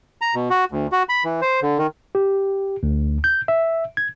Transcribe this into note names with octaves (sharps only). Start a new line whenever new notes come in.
A#5
B2
F#4
D2
F#4
B5
E3
C5
D3
D#3
G4
D2
G6
E5
G#6